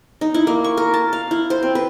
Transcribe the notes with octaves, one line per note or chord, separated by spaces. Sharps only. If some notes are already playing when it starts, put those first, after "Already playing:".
D#4
E4
A#3
C#6
A#4
A5
F5
E4
C5
C4
B4